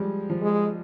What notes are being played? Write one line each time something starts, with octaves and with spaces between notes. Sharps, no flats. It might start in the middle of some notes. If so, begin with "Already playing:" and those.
Already playing: F3 G3 G#3
F3
G#3